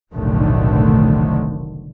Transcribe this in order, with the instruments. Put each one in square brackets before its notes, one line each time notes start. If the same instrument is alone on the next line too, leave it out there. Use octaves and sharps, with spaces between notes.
[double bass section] F1 B1 A2 D3 D#3 A3